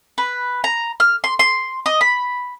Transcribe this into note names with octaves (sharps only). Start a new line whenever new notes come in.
B4
A#5
F6
C6
C6
D#5
B5